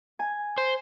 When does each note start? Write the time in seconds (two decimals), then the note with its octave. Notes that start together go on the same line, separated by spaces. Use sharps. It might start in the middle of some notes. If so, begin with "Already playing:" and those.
0.19 G#5
0.58 C5